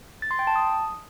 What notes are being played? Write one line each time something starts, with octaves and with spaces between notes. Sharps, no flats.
A6
C6
G5
A5
D#6